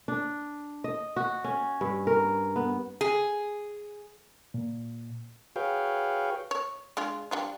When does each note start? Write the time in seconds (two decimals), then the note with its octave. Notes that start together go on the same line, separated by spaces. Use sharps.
0.08 D4
0.84 D#5
1.16 F#4
1.44 C#4
1.81 G2
2.07 A#4
2.56 B3
3.01 G#4
4.54 A#2
5.56 F#4 G#4 B4 C#5 F5 G5
6.51 C#5
6.97 G#3 D4 F4
7.31 G3 D4 F4